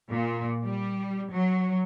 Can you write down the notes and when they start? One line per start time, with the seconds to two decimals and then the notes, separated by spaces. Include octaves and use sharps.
0.10 A#2
0.65 G3
1.32 F#3